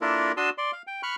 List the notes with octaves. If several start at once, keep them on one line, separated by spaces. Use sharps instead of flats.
A#3 D4 E4 F4 A4 A#4
D4 F#4 A5 C6 D#6 E6
D5 C6
F5
G5
B5 C#6 F6 F#6